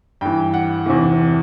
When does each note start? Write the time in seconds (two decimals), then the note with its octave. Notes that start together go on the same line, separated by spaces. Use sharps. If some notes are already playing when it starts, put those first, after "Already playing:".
0.21 G2 E3 G5
0.54 F#5
0.86 E2 C3 E3